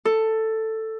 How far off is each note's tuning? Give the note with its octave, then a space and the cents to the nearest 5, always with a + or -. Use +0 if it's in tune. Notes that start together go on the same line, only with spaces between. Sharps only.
A4 +10